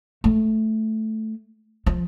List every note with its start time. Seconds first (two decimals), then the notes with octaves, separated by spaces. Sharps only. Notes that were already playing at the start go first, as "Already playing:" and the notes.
0.24 A3
1.86 F3